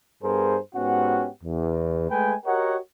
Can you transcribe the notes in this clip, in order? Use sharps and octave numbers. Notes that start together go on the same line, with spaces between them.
G2 B3 G#4 A#4 C5
G#2 B3 C#4 F#4 G4 F#5
E2
G#3 A3 B4 G5 G#5
F#4 G4 A#4 C#5 D#5 F#5